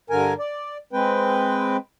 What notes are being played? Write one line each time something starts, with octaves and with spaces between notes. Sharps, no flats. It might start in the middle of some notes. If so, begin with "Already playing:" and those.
G2 D3 A#4 G#5
D5
G#3 C4 B4 G5